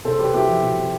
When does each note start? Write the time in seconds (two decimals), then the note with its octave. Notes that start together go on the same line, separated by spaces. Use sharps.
0.05 C3 A4 C5
0.19 C3 G4 B4
0.34 C4 E4 G4
0.48 F3 E4
0.62 C3
0.77 C3